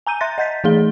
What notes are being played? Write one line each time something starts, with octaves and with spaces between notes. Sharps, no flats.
G#5 A#5 G6 D#7
E5 C6 F#6 A6 A#6
D#5 F#5 G6 A6 B6
E3 A3 D#4 G#4 F5 G7